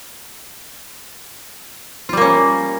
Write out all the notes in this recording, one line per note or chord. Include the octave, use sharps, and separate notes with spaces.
G3 A#3 C#4 F4